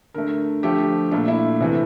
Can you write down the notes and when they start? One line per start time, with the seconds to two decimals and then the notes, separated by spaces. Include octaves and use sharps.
0.14 D3 A3 A#4
0.63 D3 F3 A3 G4
1.11 A#2 A3 D4
1.28 E4
1.60 C3 E3 A3